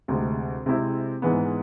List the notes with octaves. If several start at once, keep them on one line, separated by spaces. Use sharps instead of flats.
D2 C3 G#3
C3 G#3 C4 E4
G#2 E3 G#3 B3